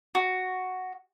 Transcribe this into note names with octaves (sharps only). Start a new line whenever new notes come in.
F#4